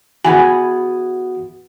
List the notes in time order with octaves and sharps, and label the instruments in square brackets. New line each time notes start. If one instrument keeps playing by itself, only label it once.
[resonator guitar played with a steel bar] E3 B3 G#4 [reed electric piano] F#4 [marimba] G#5